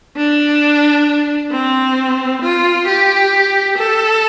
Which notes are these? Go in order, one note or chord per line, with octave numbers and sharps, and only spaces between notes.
D4
C4
F4
G4
A4